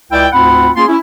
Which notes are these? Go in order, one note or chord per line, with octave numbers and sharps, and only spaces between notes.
C#2 E4 D5 G5
D2 G#2 C4 F4 F#5 B5
A#3 C#4 F4 G#4 C6
C#4 E4